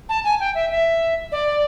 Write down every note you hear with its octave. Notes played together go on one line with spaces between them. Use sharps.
A5
G#5
G5
E5
E5
D5